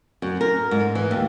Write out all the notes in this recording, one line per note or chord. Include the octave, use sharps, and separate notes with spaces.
F#2
A#4
G#2
E3
D#2